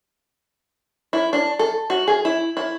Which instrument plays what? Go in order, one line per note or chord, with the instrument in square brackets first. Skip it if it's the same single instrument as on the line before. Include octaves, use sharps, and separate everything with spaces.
[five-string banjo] E4
D4
A4
F#4
G#4
E4
E4